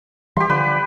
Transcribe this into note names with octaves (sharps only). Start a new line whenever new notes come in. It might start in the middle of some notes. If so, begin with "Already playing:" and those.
E3 G3 G4 C6
D3 F3 B4